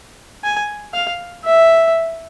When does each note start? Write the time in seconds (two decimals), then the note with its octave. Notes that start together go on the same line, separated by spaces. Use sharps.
0.44 G#5
0.94 F5
1.45 E5